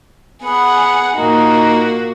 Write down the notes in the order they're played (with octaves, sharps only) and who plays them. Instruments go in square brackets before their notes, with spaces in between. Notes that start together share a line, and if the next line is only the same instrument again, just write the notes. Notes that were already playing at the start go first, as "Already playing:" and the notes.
[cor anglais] B3 [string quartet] G#4 F#5
[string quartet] A#2 A#3 F#4 [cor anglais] D#4